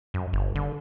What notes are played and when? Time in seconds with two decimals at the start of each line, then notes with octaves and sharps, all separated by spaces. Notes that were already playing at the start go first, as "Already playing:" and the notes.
0.14 F#2
0.33 G1
0.55 D3